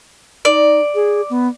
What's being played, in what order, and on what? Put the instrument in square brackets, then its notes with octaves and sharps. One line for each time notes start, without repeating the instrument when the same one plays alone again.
[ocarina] D#4 [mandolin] D5
[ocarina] G#4
B3